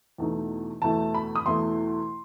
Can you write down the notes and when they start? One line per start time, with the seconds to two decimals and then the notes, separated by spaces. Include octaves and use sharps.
0.18 E2 B2 A3 D#4
0.82 E2 B2 A3 E4 A5
1.14 B5
1.36 D#6
1.46 E2 B2 A3 E4 C6